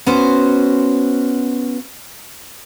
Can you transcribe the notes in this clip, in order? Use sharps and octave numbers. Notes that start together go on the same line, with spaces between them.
B3 C#4 F#4 C5